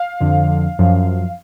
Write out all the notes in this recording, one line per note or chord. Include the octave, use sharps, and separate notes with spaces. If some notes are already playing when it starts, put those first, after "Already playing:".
Already playing: F5
F2 D3 F3
F#2 F3